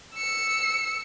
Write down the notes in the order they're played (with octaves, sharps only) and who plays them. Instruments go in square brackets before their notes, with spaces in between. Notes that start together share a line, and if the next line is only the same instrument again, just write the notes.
[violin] E6 C#7